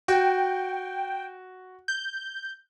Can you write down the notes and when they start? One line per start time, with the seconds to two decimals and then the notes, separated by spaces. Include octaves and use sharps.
0.08 F#4 G5
1.88 G6